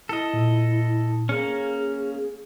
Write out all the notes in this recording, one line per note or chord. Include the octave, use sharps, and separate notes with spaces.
E4 A4 D#5
A#2
A#3 C#4 G#4 C#7